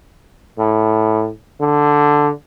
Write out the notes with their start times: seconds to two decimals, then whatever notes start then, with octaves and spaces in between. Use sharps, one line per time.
0.58 A2
1.60 D3